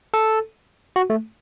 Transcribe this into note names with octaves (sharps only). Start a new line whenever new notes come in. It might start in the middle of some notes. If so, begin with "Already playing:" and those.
A4
F#4
A3